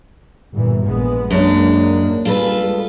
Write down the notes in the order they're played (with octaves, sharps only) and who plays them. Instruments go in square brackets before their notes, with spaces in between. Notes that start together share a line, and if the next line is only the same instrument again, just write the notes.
[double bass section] G1 A#2 E3
A#1 G#3 B3
[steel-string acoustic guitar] F#2 G#3 D4 [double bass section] A#3
[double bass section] G3 G#3 [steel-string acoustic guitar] F4 A4 B4